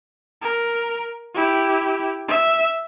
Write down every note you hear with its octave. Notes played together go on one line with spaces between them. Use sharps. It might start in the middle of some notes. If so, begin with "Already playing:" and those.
A#4
E4 G4
E5